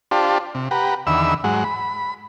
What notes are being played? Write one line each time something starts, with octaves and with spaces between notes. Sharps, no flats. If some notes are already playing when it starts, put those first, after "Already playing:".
D4 F4 G4 C5 A5
C3
G4 B4 F#5 A#5
E2 D3 D#3 E5 B5 E6
G#2 F#3 G#3 F#5
B5